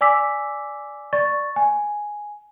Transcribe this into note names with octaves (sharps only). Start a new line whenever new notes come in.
D5 G#5 D6 E6 B6
D5 C#6 A6
G#5